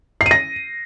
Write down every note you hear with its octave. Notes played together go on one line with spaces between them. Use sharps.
C7
D#7
A#6